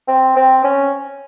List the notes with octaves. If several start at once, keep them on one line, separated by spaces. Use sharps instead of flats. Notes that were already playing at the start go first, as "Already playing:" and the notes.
C4
C4
C#4